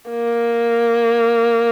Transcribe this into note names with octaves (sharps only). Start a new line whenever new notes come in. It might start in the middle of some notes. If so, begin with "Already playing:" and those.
A#3